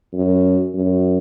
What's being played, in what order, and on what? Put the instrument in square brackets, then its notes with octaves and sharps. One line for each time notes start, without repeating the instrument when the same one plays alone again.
[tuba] F#2
F#2